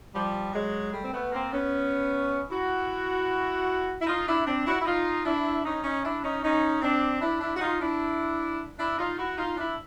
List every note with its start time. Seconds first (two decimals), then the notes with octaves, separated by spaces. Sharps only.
0.14 F3 G3
0.53 F#3 G#3
0.93 G3 A3
1.02 C4
1.13 A3 B3
1.32 A#3 C4
1.52 B3 C#4
2.50 E4 F#4
4.01 E4
4.07 D#4 F4
4.27 D4 E4
4.46 C4 D4
4.66 E4 F#4
4.80 E4
4.85 D#4 F4
5.25 D4 E4
5.64 C#4 D#4
5.84 C#4 D#4
6.04 D4 E4
6.23 C#4 D#4
6.43 C#4 D#4
6.82 C4 D4
7.21 D4 E4
7.41 D4 E4
7.56 F#4
7.61 D#4 F4
7.80 D4 E4
8.78 D4 E4
8.98 D#4 F4
9.18 E4 F#4
9.37 D#4 F4
9.57 D4 E4